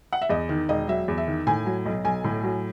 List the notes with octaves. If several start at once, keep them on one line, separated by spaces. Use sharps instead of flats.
F#5
E5
E2 D#5
D#3
E1 D#5
F#3 E5
E2
E5
D#3
A2 G#5
F#3
B1
B1 G#5
A2
F#3